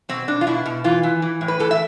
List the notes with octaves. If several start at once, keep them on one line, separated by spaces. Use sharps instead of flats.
B2 C4
B2 D4
F4
B2 E4
B2
E3 F4
E3
E3
A2
B4
E3 A4
E5